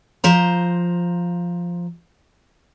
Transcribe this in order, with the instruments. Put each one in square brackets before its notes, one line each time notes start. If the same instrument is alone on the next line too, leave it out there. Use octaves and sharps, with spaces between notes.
[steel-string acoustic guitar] F3 C5 A#5